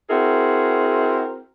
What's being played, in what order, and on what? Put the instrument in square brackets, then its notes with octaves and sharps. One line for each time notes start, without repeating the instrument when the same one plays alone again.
[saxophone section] C4 E4 F#4 G#4 A#4